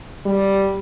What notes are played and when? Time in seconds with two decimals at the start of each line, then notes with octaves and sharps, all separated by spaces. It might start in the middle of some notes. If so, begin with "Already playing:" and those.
0.26 G3